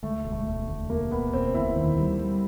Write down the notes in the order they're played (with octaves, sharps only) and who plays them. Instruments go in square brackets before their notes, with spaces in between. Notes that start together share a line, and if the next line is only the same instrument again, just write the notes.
[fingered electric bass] D2 [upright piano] A3
[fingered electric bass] E1
[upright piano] A3
[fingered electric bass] E1
D2
[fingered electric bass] E1 [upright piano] A#3
[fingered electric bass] E1 [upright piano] B3
[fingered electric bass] E1 [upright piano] C4
[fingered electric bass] D2 [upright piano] E4
[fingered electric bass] D#3
G3
G3